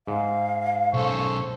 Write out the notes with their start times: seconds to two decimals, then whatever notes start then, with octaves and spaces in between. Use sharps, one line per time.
0.07 G#2 F5
0.94 B1 C#4 A4 C5 C#6